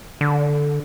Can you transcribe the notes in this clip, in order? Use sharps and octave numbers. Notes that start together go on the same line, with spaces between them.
D3